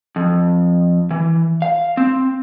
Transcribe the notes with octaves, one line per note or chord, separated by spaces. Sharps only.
F2
E3
F5
C4